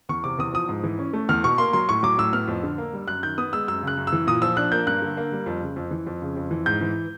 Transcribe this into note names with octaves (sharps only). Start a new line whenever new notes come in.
E2 C#6
C3 D6
E2 D#6
F3 D#6
G#2
E3
C#4
A3
E2 F6
B2 C#6
A#3 C6
F#3 C6
A2 C#6
F#3 D6
A2 E6
B3 F6
F2
D3
A#3
G3
F#2 F#6
D#3 G6
B3 D#6
G#3 E6
F#2 E6
C#3 F#6
F#2
E6
E3
A#2 D#6
F3 E6
D4 F#6
A#3 G6
G2 F#6
D3
A#3
G3
F2
C#3
F2
E3
F2
C#3
F2
E3
G#2 G6
E3